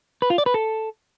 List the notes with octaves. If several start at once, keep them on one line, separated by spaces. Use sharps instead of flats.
B4
F4
D5
B4
A4